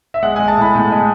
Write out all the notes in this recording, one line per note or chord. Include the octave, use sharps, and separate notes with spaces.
E5
G#3 F#5
G#3 G#5
A5
A2 B5
A2
G#3